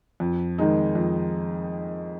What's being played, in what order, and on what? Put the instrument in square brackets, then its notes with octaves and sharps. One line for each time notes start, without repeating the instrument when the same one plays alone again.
[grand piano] F2
D#3 G#3 D#4
F2